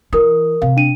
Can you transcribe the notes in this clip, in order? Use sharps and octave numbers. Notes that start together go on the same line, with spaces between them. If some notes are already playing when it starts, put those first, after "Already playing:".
E3 A#4 D#6
C3 F5
D4 D#7